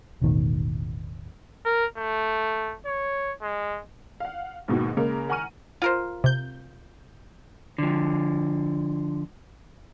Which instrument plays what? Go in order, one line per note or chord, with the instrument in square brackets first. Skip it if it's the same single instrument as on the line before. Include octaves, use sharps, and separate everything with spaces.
[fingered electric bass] E1 A1 B2 D#3
[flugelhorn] A#4
A3
C#5
G#3
[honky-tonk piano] F5 F#5
D#2 G#2 B2 D#3
C#3 G#3 A#3 A#4
F#5 G#5 A#5 C#6 F6 D#7
[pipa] F4 A#4 C5
[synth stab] C3 G6
[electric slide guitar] D3 F3